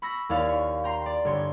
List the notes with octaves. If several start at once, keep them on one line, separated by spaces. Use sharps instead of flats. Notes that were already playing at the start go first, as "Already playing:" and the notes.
B5 C#6 E6 A#6
D#2 E4 C#5 D5 F5
C#6
G5 A#5 C6 C7
D5
G1 C#5 C6